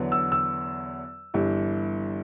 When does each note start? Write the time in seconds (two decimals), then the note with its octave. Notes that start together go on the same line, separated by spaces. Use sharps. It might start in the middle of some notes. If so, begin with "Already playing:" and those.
Already playing: E2 D3 F#3 B3
0.12 E6
0.32 E6
1.34 G1 G2 E3